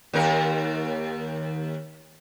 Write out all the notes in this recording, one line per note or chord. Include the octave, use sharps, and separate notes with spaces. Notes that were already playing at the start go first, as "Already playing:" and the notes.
D#2 A#4